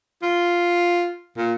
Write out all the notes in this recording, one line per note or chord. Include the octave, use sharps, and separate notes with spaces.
F4
A#2